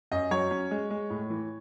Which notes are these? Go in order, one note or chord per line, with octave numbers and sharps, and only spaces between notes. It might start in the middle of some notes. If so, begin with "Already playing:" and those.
F#2 D#5
F#3 C#5
C#4
G#3
G#3
A2
E3